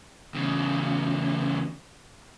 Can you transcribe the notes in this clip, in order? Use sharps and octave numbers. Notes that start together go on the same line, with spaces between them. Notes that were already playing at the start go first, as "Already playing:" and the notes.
E2 C#3